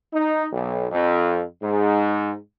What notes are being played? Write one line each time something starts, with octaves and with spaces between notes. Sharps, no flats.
D#4
B1
F2
G#2